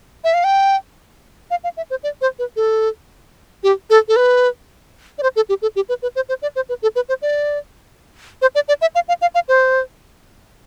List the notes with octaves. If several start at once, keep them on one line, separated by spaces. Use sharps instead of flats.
E5
F5
G5
F5
F5
E5
C5
D5
C5
B4
A4
G4
A4
A4
B4
D5
C5
A4
G4
A4
G4
B4
B4
C5
C5
D5
C5
B4
A4
B4
C5
D5
C5
D5
D5
E5
F5
F5
F5
F5
C5